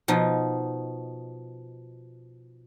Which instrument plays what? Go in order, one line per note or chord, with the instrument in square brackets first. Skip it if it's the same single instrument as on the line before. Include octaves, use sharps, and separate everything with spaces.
[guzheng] B2 F3 D#4